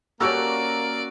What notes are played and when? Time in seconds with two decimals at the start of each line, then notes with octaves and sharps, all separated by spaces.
0.20 A#3 C#4 F#4 G4 A4 A#4 D5 E6